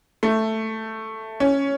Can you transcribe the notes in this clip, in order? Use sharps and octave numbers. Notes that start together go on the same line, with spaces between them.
A3
C#4